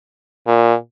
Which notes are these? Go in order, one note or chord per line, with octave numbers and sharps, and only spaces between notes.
A#2